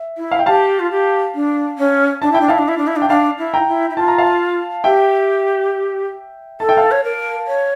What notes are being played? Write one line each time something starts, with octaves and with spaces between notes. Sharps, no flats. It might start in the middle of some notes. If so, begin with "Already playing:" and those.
Already playing: E5
E4
F5
G5
G4 F5 A5
F4
G4
D4
C#4
D4 A5
E4 G5
D4
E4 F5 A5
D4
E4
D4
E4
D4
G5
D4 F5 A5
E4
G5 A#5
E4
E4
F4 A5
A#5
F5 A5
G4 E5 G5
A4 A5
G5
F5 A5
C#5
A#4
C#5